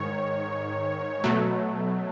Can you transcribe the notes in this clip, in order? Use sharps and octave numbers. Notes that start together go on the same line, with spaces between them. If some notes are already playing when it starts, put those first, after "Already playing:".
Already playing: G#2 D#3 C#5
B2 F#3 A3